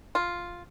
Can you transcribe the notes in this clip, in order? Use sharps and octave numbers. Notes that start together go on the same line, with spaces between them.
F4